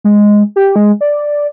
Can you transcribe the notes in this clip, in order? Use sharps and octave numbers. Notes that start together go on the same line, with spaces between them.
G#3
G4
G#3
D5